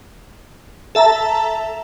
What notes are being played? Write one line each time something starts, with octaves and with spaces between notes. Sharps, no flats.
A4 E5 A5 A#5